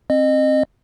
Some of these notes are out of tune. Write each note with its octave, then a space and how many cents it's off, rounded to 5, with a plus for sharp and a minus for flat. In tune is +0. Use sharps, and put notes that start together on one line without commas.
C4 +25 D#5 -25